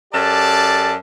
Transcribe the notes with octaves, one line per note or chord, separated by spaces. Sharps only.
F#2 G4 A4 D5 A5